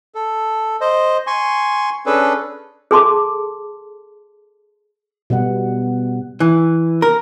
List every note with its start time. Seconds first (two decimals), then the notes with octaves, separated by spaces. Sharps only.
0.15 A4
0.81 C5 D#5
1.27 G#5 C6 C#6
2.06 C#4 D4 G#4 A4 B4
2.91 G#4 A4 A5 C6 D6
5.30 B2 G3 B3 F#5
6.40 E3
7.02 A#4